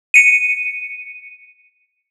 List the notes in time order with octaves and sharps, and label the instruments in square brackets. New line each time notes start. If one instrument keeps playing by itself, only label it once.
[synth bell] C#7 D#7